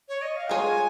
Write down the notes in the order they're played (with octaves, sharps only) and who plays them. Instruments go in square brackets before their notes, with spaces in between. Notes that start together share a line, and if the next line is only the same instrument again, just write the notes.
[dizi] C#5
D#5
F5
[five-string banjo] G#3 F4 G#4 C#5 [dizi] G#5